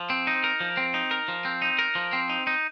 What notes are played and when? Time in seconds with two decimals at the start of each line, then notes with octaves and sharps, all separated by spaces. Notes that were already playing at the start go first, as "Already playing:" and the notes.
Already playing: F3
0.10 C4
0.27 D#4
0.44 A#4
0.60 F3
0.77 C4
0.94 D#4
1.11 A#4
1.28 F3
1.45 C4
1.62 D#4
1.79 A#4
1.95 F3
2.13 C4
2.29 D#4
2.47 D#4